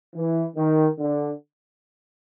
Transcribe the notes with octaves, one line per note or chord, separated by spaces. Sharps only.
E3
D#3
D3